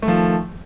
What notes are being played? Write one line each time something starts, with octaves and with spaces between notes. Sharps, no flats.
D#3 F3 A3